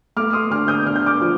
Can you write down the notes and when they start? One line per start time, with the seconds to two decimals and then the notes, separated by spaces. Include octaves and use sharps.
0.16 A3 D6 F6
0.33 C6 D#6
0.51 D3 D6 F6
0.68 D#6 G6
0.86 D3 F6
0.96 G6
1.06 D6 F6
1.21 F3